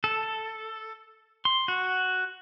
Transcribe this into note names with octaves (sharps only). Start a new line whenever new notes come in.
A4
C6
F#4